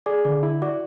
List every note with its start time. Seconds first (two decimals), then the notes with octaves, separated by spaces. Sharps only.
0.06 G#4 D5 D6
0.25 D3 D5 D6
0.43 E4
0.62 F#4 D5 D6